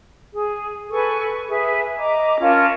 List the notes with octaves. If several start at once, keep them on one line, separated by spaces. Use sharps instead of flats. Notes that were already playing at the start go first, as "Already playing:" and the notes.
G#4
A4 B4 G#5 C#6
G#4 B4 E5
D#5 A#5 D6
C#4 F4 A#4 A5